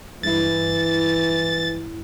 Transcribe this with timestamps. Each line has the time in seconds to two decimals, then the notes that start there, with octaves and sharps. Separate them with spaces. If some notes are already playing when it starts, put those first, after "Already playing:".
0.23 G2 E3 G#3 E4 A6